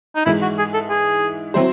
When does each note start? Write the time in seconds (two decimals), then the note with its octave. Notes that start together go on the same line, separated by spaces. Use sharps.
0.15 D#4
0.26 G#2 E3 G#3 E4
0.42 F#4
0.58 G#4
0.74 A4
0.90 G#4
1.54 F#3 C4 E4 C5